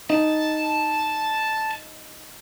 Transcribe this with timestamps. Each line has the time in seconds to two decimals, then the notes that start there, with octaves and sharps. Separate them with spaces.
0.10 D#4 A5